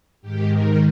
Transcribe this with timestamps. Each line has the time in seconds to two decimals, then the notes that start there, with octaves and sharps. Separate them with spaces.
0.21 G#2 D#3 G4
0.50 A#4